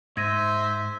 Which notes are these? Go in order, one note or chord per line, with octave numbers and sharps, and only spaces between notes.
G#2 C5 E5 G#6 A#6 D#7